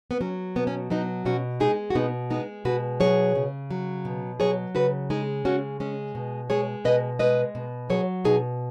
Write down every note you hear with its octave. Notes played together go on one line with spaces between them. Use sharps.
B3
F#3 C#4
B2 B3
C#4
F#3 B3 D#4
B2 C#4 F#4
G#3 D#4 G#4
F#4
B2 B3 D#4
G#3 B3 D#4
B2 F#4 B4
F#3 G#4 C#5
C#3
F#3
B2
F#3 G#4 C#5
C#3 F#4 B4
G#3 D#4 G#4
C#3 C#4 F#4
G#3 C#4
B2
G#3 G#4 C#5
B2 B4 D#5
G#3 B4 D#5
B2
F#3 G#4 C#5
B2 D#4 G#4